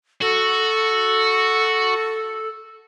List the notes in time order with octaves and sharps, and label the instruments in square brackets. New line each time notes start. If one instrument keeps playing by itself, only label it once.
[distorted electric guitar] F#4 [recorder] A4